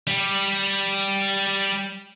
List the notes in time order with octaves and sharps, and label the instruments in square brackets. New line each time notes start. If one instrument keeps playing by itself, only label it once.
[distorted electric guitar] G3